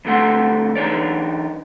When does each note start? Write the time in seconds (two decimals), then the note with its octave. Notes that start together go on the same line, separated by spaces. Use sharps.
0.05 F2 D3 A3 F#5 C6
0.75 E3 D4 D#4 C#5 D5